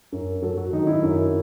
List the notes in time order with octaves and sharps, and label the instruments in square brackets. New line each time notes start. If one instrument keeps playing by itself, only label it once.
[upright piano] F#2
F#3 A4
F#4
D#3 D#4
E4
F#2